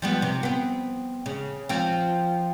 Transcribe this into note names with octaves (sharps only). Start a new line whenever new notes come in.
F3 G3 B3
C3
B3 C4
C#3
F3 C4